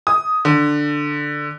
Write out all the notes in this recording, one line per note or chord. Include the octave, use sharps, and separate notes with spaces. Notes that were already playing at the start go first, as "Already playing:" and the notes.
D#6
D3